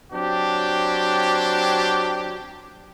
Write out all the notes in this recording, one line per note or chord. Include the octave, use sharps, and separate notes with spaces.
F#3 C4 D4 G4